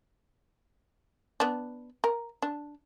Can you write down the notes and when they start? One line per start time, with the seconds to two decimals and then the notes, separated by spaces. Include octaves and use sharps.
1.40 B3 D4
2.04 A#4
2.42 D4